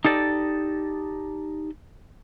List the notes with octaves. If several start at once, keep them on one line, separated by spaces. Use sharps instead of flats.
D#4 G4 A4 D5 D#5